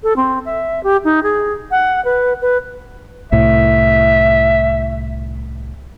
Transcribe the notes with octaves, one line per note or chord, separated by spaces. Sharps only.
A4
C4
E5
G4
D#4
G#4
F#5
B4
B4
C2 A2 E5